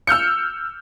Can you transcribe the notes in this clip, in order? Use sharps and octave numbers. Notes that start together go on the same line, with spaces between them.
E6 F6 G6 C#7